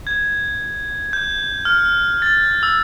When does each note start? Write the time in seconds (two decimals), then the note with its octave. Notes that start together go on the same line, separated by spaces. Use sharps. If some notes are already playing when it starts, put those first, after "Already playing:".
0.07 G#6
1.13 G6
1.65 F6
2.22 A6
2.63 E6